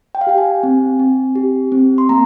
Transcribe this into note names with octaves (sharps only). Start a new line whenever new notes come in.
G5
F5
G4 G5
G#5
C4
C4
G4
C4
C6
A#3 A#5